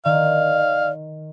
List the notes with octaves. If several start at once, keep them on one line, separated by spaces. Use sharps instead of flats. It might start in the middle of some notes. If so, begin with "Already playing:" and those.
D#3 D5 F5